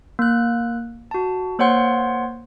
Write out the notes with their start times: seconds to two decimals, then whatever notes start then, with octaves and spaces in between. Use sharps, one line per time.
0.19 A#3 F#6
1.11 F#4 A5
1.59 A#3 C5 C#5 F#5 C6